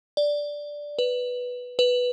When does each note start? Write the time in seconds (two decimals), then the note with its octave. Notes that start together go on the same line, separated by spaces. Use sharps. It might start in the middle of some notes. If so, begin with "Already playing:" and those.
0.17 D5
0.99 B4
1.79 B4